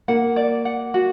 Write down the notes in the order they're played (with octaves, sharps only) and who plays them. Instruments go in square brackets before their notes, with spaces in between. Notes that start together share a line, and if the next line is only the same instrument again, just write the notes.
[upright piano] A#3 [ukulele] F#5
[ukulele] D5
F#5
F#4